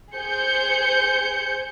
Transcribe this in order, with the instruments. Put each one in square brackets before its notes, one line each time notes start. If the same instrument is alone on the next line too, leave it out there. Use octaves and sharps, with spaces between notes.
[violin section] G#4 C5 G6 C#7